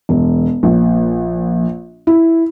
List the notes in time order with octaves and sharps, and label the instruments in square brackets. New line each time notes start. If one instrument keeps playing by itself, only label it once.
[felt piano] E1
A#1
E4